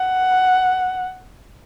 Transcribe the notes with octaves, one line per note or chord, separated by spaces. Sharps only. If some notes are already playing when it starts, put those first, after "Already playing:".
Already playing: F#5